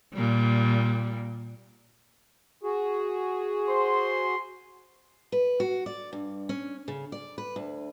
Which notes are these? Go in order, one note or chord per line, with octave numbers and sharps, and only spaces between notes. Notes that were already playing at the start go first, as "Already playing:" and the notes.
A#2 G3
F#4 G#4
C5 C6
B4
F#4
D5
G2
C#4
C#3
D5
B4
D2